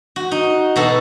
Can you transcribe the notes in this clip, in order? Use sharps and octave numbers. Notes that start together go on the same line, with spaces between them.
F#4
D#4
B2 F#4 A4